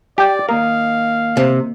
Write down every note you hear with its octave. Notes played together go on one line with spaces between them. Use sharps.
G4 D5 G5
D#3 A#3 A#4 F5 D#6
C3